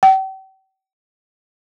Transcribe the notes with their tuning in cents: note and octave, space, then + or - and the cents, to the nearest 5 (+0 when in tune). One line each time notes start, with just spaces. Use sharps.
G5 -40